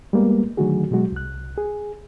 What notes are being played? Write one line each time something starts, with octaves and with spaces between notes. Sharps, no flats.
G3 G#3 A#3 B3
D3 D#3 F#3 A3 F#4 G#4
B2 F#3 G#3 F#4
C2 F#6
G#4